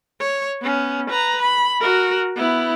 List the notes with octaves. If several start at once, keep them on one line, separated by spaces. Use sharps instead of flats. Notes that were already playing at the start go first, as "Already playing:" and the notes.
C#5
B3 C#4
B4 A#5
B5
F#4 A#4
B3 E4